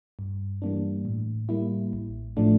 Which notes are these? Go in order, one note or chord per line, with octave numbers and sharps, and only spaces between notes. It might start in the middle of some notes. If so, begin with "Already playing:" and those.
G2
E3 G3 A#3 D4
A2
G3 A#3 E4
A1
A2 F3 A3 D4